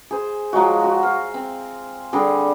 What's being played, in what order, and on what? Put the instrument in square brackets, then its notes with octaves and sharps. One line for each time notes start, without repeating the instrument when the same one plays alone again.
[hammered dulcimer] G#4 C5
F3 F#3 G#3 F#4
F#4
F5
C4
D3 G3 C4 G#4